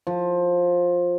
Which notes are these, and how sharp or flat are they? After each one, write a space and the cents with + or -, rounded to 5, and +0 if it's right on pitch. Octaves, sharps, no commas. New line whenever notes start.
F3 +15